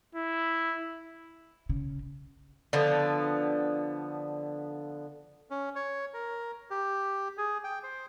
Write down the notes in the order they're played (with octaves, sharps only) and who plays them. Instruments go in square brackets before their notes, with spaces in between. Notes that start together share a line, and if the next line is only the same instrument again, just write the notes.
[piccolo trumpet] E4
[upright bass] C#3
[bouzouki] D3 F3 B3
[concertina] C#4
C#5
A#4
G4
G#4
G5
C5